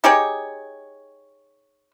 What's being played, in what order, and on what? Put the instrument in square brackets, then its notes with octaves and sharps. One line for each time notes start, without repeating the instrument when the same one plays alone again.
[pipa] D#4 G4 G#4 C#5